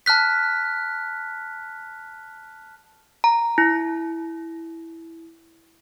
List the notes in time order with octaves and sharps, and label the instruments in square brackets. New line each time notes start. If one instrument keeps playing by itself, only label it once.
[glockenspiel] A5 F6 F#6 B6
[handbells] A#5
E4